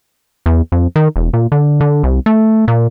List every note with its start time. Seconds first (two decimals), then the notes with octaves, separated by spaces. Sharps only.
0.46 E2
0.72 F2
0.96 D#3
1.16 E1
1.33 A#2
1.52 D3
1.81 D3
2.03 C2
2.26 A3
2.68 A#2